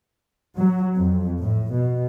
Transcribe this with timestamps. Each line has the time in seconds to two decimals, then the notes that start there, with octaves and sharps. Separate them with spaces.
0.56 F#3
0.94 F2
1.39 A2
1.73 B2